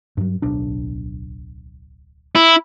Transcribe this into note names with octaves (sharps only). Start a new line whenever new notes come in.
G2 F#3
D1 B1 D4
E4